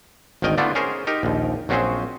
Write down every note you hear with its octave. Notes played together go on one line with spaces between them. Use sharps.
G#1 D2 D#3 A#4 D#5 G5
D3 A3 B3 D4 E4 F4
C#4 G#4 A#4 C5
D#4 G4 A#4
A#1 D#2
A#1 F#3 C4 C#4 G#4 C5